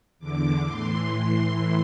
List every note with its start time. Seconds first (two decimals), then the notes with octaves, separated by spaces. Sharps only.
0.19 E2 D3 D6
0.65 A2 E3 C6